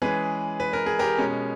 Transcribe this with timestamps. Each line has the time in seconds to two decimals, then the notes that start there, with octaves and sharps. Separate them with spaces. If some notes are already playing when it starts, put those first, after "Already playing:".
0.02 E3 G#3 C#4 G#4 B4
0.60 B4
0.73 A#4
0.86 G#4
0.99 G4 A#4
1.18 B2 G#3 C#4